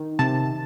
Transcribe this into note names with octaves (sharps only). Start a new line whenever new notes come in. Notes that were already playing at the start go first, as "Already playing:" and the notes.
Already playing: D#3
C3 A5